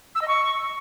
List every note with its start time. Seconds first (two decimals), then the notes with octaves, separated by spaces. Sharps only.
0.15 E6
0.21 D#5
0.28 C#6